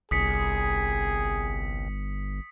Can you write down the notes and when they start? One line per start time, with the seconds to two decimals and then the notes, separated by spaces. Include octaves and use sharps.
0.11 G1 C2 G#4 D#6 B6 C#7